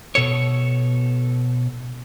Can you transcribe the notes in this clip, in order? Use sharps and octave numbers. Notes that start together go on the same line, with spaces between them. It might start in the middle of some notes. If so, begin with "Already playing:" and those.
B2 A4 C#5